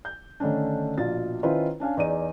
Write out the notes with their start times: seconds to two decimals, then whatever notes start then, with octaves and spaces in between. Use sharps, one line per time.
0.05 G6
0.40 D3 D#3 A3 C#4 D4
0.98 A#1 B2 F4 A6
1.43 D#3 C#4 E4 F4 B4 C5
1.80 C#4 D4 F5 G#5
1.97 E2 D#4 G#4 D5 D#7